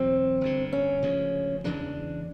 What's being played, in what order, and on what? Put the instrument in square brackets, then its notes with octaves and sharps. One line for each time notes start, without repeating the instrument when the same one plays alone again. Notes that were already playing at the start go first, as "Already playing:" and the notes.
Already playing: [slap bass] E2 B2 F#3 [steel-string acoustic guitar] C4
[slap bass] G1 G2 D3
[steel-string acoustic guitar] C#4
[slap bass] D2 C#3 F3 G#3
[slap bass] E2 C#3 E3 G#3 [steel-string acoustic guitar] D4